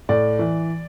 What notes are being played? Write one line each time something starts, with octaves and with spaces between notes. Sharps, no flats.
A2 D5
E3